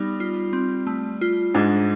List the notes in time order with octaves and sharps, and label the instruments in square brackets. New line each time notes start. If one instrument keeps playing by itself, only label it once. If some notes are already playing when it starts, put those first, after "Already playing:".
Already playing: [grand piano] G3 [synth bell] B3 D#4
[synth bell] F4
C4
A3
F4
[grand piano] G#2 G#3 [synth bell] D4